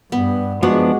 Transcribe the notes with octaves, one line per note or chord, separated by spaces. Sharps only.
G2 B3
F3 G#3 B3 D4 F#4